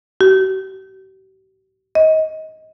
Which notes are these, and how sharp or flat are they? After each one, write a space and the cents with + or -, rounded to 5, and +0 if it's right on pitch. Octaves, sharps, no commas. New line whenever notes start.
G4 -45
D#5 +20